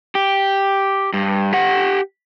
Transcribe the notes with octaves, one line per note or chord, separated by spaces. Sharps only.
G4
G2
G4 F#5